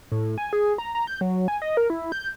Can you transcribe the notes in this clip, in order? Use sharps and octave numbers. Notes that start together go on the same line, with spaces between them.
A2
G#5
G#4
A#5
A#5
G6
F#3
G#5
D#5
A#4
E4
G6